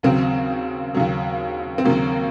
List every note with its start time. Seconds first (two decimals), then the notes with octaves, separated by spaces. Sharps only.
0.03 D#2 C#3 F#3 C4
0.94 D#2 C#3 F#3
1.78 C4
1.85 D#2 C#3 F#3 A#3